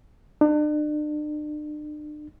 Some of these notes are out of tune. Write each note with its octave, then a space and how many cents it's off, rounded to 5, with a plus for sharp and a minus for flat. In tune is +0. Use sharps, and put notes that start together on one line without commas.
D4 +40